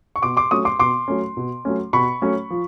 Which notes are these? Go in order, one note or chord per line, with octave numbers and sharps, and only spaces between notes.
C#6
B2 C6 D6
C6 D6
F#3 A3 C#4 C#6 D#6
C6 D6
B2 C6 D6
F#3 A3 C#4
B2
F#3 A3 C#4
B2 B5 C#6
F#3 A3 C#4
F3